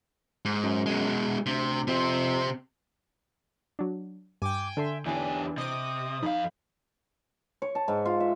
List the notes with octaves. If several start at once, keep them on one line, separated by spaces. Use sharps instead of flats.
G#2
F#2
B2 G#3
D2 C3
F2 C3 C4
F#3 D4
G2 G5 G#5 D6
D3 A4 E5 C6
E2 E3 D4 G4 G#5
C3 D#5 D6 D#6
F2 D#4 F5 B5
C#5
A5
G#2
F4
E5